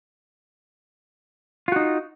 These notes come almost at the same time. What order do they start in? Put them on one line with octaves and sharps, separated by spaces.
F4 F#4 D#4